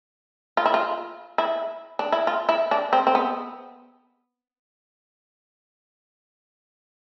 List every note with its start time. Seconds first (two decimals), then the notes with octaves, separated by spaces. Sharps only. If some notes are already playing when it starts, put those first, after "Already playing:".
0.57 F4
0.66 E4
0.74 F4
1.38 E4
1.99 D4
2.12 E4
2.27 F4
2.49 E4
2.71 D4
2.93 C4
3.07 C4
3.15 B3